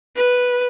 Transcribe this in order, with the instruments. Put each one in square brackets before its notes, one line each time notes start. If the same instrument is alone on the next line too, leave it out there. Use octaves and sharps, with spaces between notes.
[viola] B4